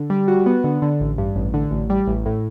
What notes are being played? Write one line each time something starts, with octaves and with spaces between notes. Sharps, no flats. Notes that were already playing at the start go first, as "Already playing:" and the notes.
Already playing: D3
G3
F#4
B3
D3
D3
A1
G2
A1
D3
A1
G3
A1
A2